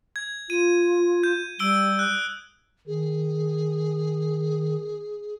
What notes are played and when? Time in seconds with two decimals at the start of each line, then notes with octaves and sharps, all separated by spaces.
0.16 G#6
0.50 F4 D#7
1.23 G6
1.59 G3 E6 D7 G7
1.99 D#6 F#6
2.87 D#3 G#4